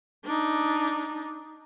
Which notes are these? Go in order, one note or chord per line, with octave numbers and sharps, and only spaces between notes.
D4 D#4